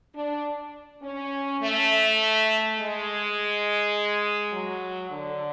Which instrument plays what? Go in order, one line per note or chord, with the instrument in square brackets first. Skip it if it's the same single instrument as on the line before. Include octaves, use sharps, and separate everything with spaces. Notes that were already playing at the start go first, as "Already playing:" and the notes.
[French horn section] D4
C#4
A3
G#3
F#3
D3